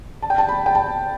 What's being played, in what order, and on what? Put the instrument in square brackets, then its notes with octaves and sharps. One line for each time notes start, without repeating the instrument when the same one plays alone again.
[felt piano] A5
G5
A5
B5
G5
A5